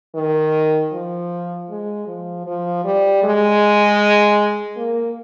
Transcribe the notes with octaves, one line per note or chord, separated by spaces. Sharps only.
D#3
F3
G#3
F3
F3
G3
G#3
A#3